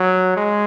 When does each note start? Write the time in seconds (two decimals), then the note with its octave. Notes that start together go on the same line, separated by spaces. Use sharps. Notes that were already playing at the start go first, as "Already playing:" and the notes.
Already playing: F#3
0.37 G#3